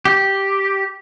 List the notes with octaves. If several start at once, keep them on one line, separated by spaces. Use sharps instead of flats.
G4